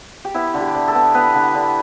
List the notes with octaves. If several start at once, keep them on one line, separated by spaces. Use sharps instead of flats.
G4
B3 E4
D3
G4
D3
A4
B3
B3 B4
D3
D3